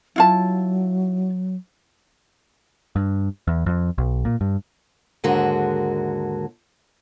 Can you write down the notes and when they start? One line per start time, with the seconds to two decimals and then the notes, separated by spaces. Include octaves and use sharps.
0.16 F#3 E4 F4 A5
2.96 G2
3.47 E2
3.66 F2
3.98 B1
4.25 A#2
4.41 G2
5.24 D#2 G#2 D3 G#3 F#4 A#4